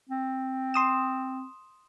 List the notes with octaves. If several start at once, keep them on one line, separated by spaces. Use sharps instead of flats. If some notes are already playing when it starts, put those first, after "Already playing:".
C4
C6 D#6 E7